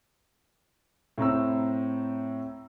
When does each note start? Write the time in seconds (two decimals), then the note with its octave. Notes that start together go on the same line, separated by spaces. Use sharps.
1.18 A2 C4 A#5 E6